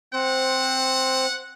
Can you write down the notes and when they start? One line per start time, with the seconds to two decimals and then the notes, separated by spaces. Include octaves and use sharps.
0.13 C4 C5 F#5